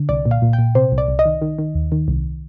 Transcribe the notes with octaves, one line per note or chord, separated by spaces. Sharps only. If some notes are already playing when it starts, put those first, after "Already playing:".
Already playing: D3
C2 D5
A#2
F5
A#2
G5
A#2
C3 C5
C2
D5
C2
D#5
D#3
D#3
D#3
D#2
D#3
C2